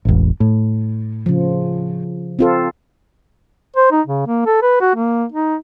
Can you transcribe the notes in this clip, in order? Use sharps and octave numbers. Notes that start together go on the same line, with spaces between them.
E1 A1
A2
C#3 F3
C4 F4 A4
C5
D#4
C#3
A#3
A4
B4
F#4
A#3
D#4